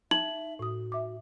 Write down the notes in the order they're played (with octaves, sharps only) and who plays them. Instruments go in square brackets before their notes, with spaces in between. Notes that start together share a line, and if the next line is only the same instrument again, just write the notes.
[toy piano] D#4 [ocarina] E5 [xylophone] F#7
[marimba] A2 D#6 [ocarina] F#4
[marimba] E5 D6